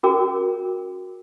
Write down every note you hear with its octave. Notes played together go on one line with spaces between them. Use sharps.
C#4 F#4 G#4 A#4 G5 D6